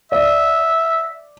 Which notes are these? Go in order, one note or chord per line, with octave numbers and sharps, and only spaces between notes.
D5 E5